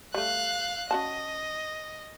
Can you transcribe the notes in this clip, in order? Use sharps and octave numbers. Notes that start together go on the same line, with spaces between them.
G3 A3 F5 F#6
C#4 F#4 D#5 A5